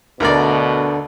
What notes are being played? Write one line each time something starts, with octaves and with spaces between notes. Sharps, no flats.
D2 B2 D3 A#4 D5